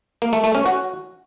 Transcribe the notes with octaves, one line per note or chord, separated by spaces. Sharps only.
A#3
A3
A3
C#4
F#4